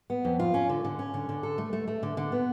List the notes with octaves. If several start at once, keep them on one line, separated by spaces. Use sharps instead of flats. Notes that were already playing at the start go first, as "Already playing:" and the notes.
B3
F2
F4
C#4
D3
D3
C#4
D3
D3
A4
A3
A3
A3
D3
D3
B3